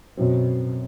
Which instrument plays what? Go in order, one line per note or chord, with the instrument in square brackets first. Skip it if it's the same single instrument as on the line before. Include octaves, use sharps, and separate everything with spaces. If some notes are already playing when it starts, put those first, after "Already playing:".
[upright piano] F#2 F#3 C4 [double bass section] B2